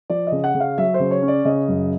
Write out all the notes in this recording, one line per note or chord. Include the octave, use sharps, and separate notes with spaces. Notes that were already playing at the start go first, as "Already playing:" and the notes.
F3 D5
C#3 D#5
F#5
C#3
F5
F#3 E5
C5
C#3
C#5
C#4
D5
C#3 D#5
F#2